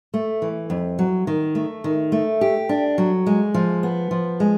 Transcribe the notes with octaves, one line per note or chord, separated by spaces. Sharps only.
A3
E3
F2
F#3
D#3
A3
D#3
A3
G4
D4
F#3
G#3
F3
B3
F3
G#3